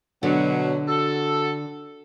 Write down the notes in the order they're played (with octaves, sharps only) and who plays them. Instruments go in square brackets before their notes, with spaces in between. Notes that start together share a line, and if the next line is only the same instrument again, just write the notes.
[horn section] B2 F#3 [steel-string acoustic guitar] D3
[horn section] F#4 A4